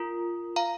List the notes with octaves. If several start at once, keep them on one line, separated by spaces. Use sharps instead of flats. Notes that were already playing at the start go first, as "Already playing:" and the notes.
Already playing: F4 A#4
F5 A#5